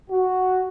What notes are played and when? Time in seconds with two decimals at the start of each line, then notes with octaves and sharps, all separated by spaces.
0.10 F#4